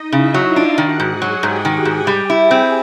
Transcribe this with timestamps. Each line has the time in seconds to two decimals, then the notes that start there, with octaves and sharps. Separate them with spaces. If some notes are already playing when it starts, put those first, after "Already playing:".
Already playing: D#4 D#5
0.12 C#3 E4 E5
0.34 F#3
0.45 F4 F5
0.56 D4
0.77 D#3 F#4 F#5
1.00 G#2
1.10 G#4 G#5
1.22 F#3
1.42 G#2 G4 G5
1.65 D#3
1.85 G#2
2.07 G3 G4 G5
2.30 E4
2.40 G#4 G#5
2.51 C4